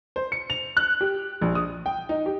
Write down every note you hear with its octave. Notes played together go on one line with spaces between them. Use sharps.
C5
C#7
F7
F#6
G4
A#1
D#6
G5
D#4
G4